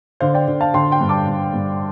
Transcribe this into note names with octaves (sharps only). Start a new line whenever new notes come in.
D3 C5 F5
D5 G5
D3
F5 A5
D3 G5 C6
G5 C6
G2
A5 D6
G2
G2